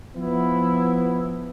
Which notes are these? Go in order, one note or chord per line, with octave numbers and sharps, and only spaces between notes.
F3 B3 E4